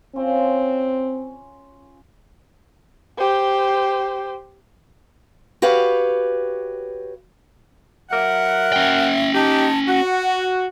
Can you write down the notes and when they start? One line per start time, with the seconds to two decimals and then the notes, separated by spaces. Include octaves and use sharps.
0.16 C4 C#4 F4
3.18 G4 C5
5.62 F#4 G4 B4 C#5 F5
8.11 F#3 A#4 E5 F#5
8.73 C#4 G5
9.35 D#4 G4 A5
9.88 F#4 F#5